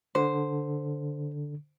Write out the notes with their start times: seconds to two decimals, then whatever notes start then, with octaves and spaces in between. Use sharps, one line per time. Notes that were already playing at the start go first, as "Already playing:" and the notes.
0.15 D3 C5